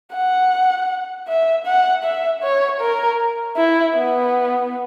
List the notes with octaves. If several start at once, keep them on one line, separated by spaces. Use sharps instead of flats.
F#5
E5
F#5
E5
C#5
A#4
E4
B3